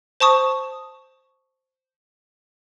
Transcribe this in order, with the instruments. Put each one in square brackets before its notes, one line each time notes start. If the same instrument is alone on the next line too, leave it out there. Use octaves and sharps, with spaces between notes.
[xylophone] C5 A5 C#6 D#6